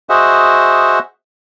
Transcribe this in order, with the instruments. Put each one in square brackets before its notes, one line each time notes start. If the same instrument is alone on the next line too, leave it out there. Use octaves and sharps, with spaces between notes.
[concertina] F#4 G#4 C5 D#5 E5 F#5